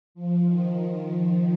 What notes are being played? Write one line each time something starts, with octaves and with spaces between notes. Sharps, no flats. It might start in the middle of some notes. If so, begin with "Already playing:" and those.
F3
D#3